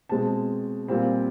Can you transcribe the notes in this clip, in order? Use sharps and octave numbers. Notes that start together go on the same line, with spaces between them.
B2 G#3 C4 A5
A#2 G3 C4